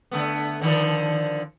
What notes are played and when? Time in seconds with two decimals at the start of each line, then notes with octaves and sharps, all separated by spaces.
0.11 D3 A3 B3
0.61 D3 D#3 F3